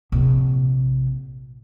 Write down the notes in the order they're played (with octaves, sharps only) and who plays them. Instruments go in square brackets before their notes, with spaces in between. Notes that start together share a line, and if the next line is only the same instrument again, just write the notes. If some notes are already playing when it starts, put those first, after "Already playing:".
[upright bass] A#1 C3